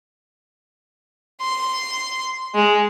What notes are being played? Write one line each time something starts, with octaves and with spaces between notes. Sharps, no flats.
C6
G#3